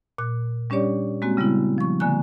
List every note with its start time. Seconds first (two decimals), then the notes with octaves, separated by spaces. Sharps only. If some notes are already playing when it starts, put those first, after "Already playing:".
0.18 A#2 F#6
0.70 G3 C#4 D4 G4 C#5 D5
1.22 G#3 A#3 C4 F#4
1.37 C#3 G3 B3 E4
1.78 F3 C#6
2.00 D3 A#3 G#5 F#6